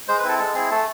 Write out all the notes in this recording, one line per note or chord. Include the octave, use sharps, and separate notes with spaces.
G#3 C5
B4
C4 E4 A4
G#3 A4
C4 E4 G#4
A3 A4